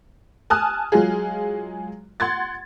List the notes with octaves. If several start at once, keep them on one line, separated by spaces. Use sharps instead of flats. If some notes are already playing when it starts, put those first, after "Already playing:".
G#5 A5 D#6 F6 F#6
F#3 G#3 F4 G#4
F#5 C6 G#6 A6